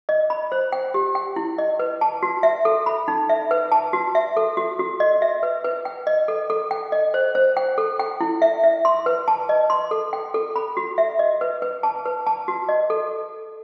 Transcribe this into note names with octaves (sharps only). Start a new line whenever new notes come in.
D#5
B5
C5
G5
G4
G5
E4
D#5
B4
A5
F#4
E5
A4
B5
D#4
E5
B4
A5
F#4
E5
A4
F#4
F#4
D#5
E5
B4
B4
G5
D#5
A4
A4
G5
D#5
C5
C5
G5
A4
G5
E4
E5
E5
C6
B4
A5
D#5
C6
A4
G5
A4
B5
F#4
E5
D#5
B4
B4
A5
B4
A5
F#4
D#5
A4